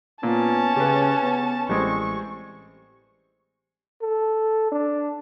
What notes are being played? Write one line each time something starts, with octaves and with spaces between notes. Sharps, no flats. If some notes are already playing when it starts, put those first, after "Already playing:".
A#2 B3 C#4 A5
C#3 G4 B4
B3
A1 G3 G#3 C4 C#6
A4
D4